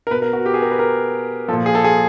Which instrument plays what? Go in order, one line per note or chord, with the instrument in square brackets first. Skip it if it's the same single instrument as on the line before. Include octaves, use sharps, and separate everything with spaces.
[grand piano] A#4
B2 B4
A#4
F#4
G4
G#4
A#4
B4
A#4
F3 A4
A#2
G#4
A4
G#4